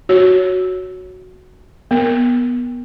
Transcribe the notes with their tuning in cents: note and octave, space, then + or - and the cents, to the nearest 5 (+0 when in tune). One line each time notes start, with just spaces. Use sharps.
F#4 +0 C#5 +0
B3 -10 A#4 +0